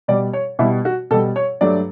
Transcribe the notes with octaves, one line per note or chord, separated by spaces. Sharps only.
B2 G3 D5
C#5
B2 G3 E4
F#4
B2 G3 A4
C#5
G2 F#3 A3 D5